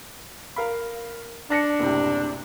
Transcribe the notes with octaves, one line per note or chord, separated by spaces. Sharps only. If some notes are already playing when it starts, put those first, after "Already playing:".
A#4 F5 B5
D4 A5 A#6 C#7
F#1 A2 C3